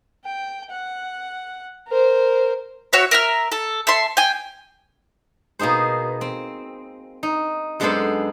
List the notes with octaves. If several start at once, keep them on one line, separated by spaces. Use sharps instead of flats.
G5
F#5
A#4 C5
F#4 C#5 E5
A#4 E5 F6
A4
A4 E5 C6
G5 G#5
B2 A#3 D#4 G#4 C5
C4
D#4
F#2 G#3 B3 D4 A4 C5